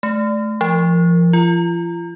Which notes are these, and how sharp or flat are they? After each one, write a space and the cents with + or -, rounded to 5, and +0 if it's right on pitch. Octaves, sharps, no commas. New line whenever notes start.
A3 -25
F3 -35
F4 -40